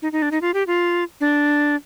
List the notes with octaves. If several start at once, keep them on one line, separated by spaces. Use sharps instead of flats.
D#4
D#4
D4
D#4
F4
G4
F4
D4